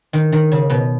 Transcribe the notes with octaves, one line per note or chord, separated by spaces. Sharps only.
D#3
D#3
C#3
B2